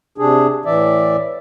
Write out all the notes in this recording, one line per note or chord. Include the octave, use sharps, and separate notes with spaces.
C3 D4 G#4
A2 E3 D5 E5